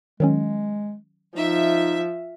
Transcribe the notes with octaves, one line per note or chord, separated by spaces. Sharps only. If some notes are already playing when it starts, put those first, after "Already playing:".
D#3 F#3 G#3 C#4
F3 D#4 E5